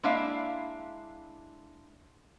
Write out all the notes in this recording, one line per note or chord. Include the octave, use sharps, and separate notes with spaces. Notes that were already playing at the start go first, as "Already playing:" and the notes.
G#3 A#3 D4 E4 E5 F5